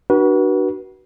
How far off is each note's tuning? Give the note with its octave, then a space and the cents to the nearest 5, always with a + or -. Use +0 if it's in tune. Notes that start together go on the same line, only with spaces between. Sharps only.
D4 +30 F#4 +25 B4 -35